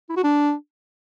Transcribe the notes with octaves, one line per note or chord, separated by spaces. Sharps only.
E4
F#4
D4